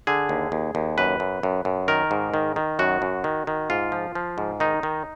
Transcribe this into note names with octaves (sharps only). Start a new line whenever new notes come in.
D3 G#4
D#2
D#2
D#2
F#2 B4
F#2
F#2
F#2
D#3 A#4
G#2
D#3
D#3
F#2 F#4
F#2
D#3
D#3
G#2 F4
F3
F3
G#2
D#3 D#4
D#3